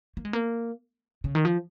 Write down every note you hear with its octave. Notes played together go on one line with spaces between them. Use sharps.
A#3
G#3
A#3
C#3
D#3
F3